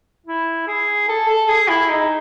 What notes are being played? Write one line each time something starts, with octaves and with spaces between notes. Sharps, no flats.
E4
G#4
A4
A4
G#4
E4
D#4